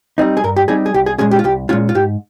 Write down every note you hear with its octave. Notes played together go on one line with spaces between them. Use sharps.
G3 C4 D#4
G#4
G2 A#4
G4
G3 C4 D#4 G#4
G#4
C2 G4
G#4
A#2 G#3 C#4 G#4
G4
F4
C2 G4
A#2 G#3 C#4 F4
F4
G#2 G4